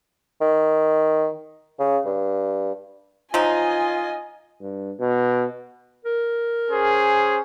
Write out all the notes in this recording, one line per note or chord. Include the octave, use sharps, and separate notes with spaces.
D#3
C#3
G2
F3 F#3 D#4 F4 D#5 G#5
G2
B2
A#4
C#4 G#4 C5